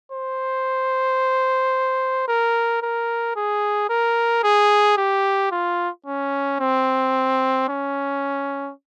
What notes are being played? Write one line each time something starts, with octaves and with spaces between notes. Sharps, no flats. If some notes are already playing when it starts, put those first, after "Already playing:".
C5
A#4
A#4
G#4
A#4
G#4
G4
F4
C#4
C4
C#4